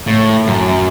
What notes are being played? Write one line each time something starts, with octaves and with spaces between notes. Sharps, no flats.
A2
F#2